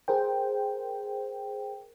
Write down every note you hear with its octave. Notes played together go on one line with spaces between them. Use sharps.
G#4 A#4 C5 G5